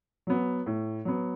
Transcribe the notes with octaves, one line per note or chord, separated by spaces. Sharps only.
F#3 B3
A2
F#3 B3